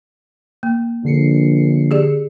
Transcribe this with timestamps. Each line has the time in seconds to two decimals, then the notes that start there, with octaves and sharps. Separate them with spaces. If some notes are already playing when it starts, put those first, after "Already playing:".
0.63 A#3
1.05 A#1 D3 C7 C#7
1.91 G4 G#4 D5